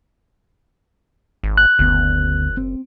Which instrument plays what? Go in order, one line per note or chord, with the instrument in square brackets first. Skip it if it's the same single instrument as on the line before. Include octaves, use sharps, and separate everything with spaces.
[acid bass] G#1
[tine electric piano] F#6
[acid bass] F#1 [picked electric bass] D2 B3
[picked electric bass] C4